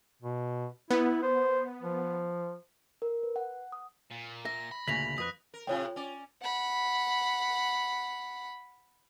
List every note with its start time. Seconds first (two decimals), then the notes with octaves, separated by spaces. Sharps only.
0.22 B2
0.91 B3 E4
1.23 C5
1.82 F3
3.02 A#4
3.23 B4
3.36 F#5
3.72 D#6
4.11 A#2
4.45 E5 A#6
4.71 B5
4.88 D2 A#2 C#3 A#6 B6 F7 F#7
5.18 F2 B4 D#6 F#6
5.54 A#4
5.67 A2 C3 F4 C#5 G5
5.96 C#4 D5
6.42 F#5 B5